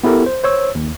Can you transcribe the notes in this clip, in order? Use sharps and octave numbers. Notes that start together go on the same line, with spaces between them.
B3 E4 G4 A4 A#4
C5
C5 C#5 E6
D#2